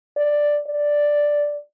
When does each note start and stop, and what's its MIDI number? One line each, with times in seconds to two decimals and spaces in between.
0.17 0.59 74
0.67 1.61 74